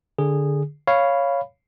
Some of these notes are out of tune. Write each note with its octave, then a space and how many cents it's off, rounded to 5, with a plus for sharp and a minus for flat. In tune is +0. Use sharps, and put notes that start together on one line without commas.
D3 +0 G#4 -15
C#5 +0 F5 -5 B5 +0